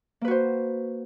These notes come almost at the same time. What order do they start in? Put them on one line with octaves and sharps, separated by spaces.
A#3 B4 F#4 C5